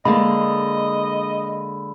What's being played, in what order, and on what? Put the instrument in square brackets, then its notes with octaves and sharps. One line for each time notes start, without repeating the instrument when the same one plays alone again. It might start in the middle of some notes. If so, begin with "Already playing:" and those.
[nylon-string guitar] D3 G#3 A#3 [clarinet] D#5 [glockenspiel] B5